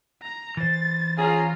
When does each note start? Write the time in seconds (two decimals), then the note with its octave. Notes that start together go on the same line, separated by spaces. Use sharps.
0.22 A#5
0.57 E3 C5 A6
1.18 C#4 F4 G#4 F5 A#5